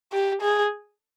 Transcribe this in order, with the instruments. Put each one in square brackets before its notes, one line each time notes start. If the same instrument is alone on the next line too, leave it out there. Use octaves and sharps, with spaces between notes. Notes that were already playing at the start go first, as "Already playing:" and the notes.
[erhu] G4
G#4